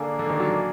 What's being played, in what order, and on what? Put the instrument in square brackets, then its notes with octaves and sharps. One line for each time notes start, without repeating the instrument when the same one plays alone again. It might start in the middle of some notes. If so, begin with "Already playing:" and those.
Already playing: [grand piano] D3 [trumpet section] A#3 D4 G#4 D5
[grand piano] D3
D#3
F#3
F#3